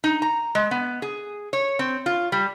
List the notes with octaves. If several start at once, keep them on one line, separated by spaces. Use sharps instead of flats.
D#4
A#5
G#3
B3
G#4
C#5
C4
F4
G3